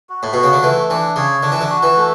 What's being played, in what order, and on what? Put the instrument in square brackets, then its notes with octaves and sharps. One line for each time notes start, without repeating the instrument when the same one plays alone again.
[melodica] F#4
[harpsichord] A2
[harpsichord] B2 [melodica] F#4
[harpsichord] C#3
D3
[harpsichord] E3 [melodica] A3
[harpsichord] E3 [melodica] D4
[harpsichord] C#3 [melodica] C#5
[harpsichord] D3 [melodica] D4
[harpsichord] E3
D3
[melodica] F#4
[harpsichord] E3
[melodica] A3